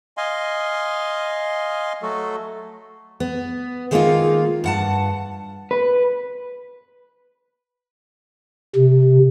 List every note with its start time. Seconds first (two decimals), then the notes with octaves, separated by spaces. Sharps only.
0.17 D#5 F5 G#5 C6
2.02 F#3 A3 F#4 A4
3.20 B3
3.91 D#3 G#3 A#3 B3 D#4 F4
4.64 G2 F#5 A5
5.71 B4
8.76 C3